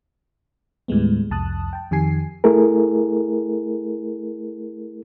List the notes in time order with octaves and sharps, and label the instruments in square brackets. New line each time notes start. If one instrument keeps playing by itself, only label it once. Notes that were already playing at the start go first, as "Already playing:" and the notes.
[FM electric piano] D#2 A2 G3 G#3 B3
C2 F2 A5 D#6 F#6
G5 A5
F2 D#3 G4 G#5 C7
[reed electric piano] A3 E4 G#4 A#4